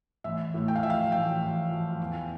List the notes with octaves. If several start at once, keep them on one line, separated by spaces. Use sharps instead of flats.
A1 E5
A2
G5
F5
F3 E5
F5
A1 G5
A1
F3
E2